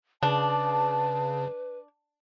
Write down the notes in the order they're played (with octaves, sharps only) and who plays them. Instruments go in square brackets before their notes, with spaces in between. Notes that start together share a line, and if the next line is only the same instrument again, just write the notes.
[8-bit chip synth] C#3 [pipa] D4 [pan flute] B4 [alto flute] A5